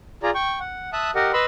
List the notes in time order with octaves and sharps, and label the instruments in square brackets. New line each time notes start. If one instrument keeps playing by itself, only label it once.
[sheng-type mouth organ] F4 G#4 D5 A#5
G5 C#6
F#5
E5 A5 D#6 F#6
G4 A#4 D#5 F#5
B4 D#5 B5 C6 E6